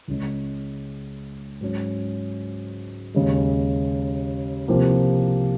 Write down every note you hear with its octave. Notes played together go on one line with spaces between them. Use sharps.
C#2 C#3 G#3 C#4
G#2 F#3 C#4
D#2 C#3 G#3
C2 C3 F3 A#3